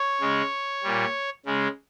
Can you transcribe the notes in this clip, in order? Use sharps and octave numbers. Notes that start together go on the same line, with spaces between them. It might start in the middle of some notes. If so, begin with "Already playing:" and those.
Already playing: C#5
C#3 G#3
A#2 G3
C#3 G#3